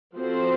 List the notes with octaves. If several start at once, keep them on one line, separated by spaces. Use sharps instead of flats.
F3 C4 F#4 A4 C5